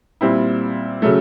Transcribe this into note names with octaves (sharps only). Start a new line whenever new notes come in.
A#2 G3 C4 E4
C#3 F#3 A3